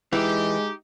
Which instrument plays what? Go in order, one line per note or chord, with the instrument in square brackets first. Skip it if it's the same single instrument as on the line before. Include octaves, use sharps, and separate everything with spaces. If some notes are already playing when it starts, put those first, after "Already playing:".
[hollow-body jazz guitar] E3 [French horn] G#3 [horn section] D#4 G4